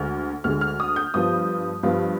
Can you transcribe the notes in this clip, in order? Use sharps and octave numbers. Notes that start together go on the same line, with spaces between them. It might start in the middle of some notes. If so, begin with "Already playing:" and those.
Already playing: D2 D3 G#3 F6
D2 D3 G#3 F6
F6
D#6
G6
G2 F3 B3 F4 D#6
G2 F3 B3 F4